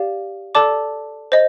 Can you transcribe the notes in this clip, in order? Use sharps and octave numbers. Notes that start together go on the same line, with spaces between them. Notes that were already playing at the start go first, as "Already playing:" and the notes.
Already playing: G4 D5 F5
A4 D5 A5 D6
C5 D#5